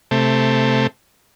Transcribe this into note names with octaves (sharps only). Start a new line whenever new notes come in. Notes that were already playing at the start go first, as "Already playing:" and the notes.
C3 A3